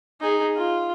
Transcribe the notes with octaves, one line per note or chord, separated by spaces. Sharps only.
D#4 G#4
F4